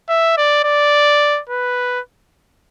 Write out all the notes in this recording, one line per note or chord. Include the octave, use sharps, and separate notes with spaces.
E5
D5
D5
B4